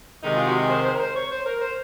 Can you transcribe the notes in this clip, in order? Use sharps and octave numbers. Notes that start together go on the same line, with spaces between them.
C3 D#3 G#3 D#4
F4
F#4
C5
C5
A#4
C5
C#5
C5
A#4
C5